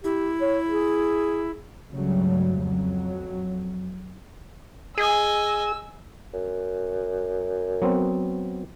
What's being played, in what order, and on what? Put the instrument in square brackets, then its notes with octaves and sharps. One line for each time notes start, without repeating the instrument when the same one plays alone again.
[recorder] E4 [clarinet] G4
[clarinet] C#5
G#4
[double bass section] C#2 G2 C#3 F#3 G3 A3
F2 F#3
[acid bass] G#4 [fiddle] D#5 G#5 [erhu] E6
[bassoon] F#2
[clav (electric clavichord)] F#3 B3 C4